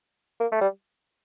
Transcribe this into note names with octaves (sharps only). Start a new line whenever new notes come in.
A#3
A3
G3